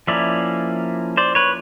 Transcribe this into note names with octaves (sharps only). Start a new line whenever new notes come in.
F3 A#3 C#4 E4 D5 E5
C5 D5
B4 C#5